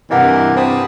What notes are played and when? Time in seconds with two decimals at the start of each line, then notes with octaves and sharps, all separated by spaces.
0.11 G2 C3 E3 G4 A#4 D#5 F5 F#5
0.57 C4 A5 B5 D#6